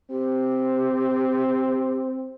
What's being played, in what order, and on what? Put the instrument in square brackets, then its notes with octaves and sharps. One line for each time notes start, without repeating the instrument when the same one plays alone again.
[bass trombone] C4 [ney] G4